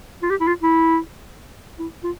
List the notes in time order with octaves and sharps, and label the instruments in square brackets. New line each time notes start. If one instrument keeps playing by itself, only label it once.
[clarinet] F4
G4
E4
F4
E4
E4
F4